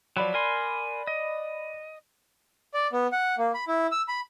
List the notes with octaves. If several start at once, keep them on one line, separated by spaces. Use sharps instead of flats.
F3 F#3 D5 B5 F#6
A#4 G#5 C6
D#5
D5
B3
F#5
A#3
B5
E4
E6
B5